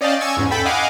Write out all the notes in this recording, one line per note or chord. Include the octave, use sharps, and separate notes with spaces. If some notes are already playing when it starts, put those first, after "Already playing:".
C#4 D5 D#5 F5 G5 A5
G#5 C#6 E6 G#6
E2 G#2 C#4
A4 G5 B5 B6
D#5 F5 F#5 G#5 D6